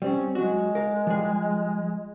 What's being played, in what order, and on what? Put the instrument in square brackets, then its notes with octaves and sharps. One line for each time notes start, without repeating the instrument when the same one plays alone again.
[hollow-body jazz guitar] G3 C4 C#4
[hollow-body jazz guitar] F#3 F#4 [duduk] G#3
[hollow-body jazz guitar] A#4 F5
F3 G3 G#4